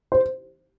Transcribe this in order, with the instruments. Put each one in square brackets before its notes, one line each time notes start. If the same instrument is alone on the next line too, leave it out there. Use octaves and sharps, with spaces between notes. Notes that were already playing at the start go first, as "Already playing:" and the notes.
[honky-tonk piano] C5